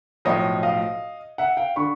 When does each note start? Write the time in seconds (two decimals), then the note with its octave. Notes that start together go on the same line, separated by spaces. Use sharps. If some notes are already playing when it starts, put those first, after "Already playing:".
0.25 B1 A2 F3 C#5 D#5
0.63 D#5 F5
1.38 E5 F#5
1.57 F5 G5
1.76 D3 B5 C#6